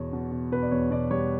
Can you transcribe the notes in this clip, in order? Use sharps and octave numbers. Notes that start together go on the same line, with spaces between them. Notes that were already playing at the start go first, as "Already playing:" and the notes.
Already playing: E2 B2 C#5
B2
B2
B2 B4
D5
E2 C#5
B2 D5
G3 C#5